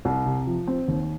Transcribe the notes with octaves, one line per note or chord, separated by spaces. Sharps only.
C2
C3
F3
C4
D#2